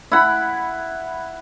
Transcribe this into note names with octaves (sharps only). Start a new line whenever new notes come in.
E4 F#5 B5